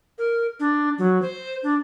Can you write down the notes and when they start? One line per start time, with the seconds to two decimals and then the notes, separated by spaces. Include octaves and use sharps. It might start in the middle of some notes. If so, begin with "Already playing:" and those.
0.18 A#4
0.60 D4
0.98 F#3
1.22 C5
1.63 D4